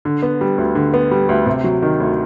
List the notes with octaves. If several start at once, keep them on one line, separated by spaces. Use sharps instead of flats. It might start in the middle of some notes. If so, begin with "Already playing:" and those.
D3
B3
G3
D2
D3
B3
G3
D2
C3
F#3
D#3
D2